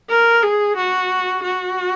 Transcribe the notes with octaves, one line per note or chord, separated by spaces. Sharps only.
A#4
G#4
F#4
F#4